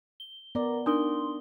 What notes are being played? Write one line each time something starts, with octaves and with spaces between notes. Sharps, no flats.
G7
B3 A#4 D5 A#5
D4 D#4 A#4 C6 D#6 G7